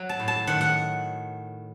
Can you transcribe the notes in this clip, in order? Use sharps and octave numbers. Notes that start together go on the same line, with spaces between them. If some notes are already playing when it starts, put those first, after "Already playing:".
Already playing: F#3
A5
A2
A5
D#3 F#5
F#5